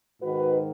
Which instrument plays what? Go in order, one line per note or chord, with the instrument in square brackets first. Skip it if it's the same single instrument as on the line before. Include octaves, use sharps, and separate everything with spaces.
[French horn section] G#2 D#3 F#4 B4